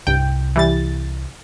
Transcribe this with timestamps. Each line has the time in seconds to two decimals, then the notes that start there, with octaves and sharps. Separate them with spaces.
0.07 C2 G2 G5
0.56 E3 G3 A6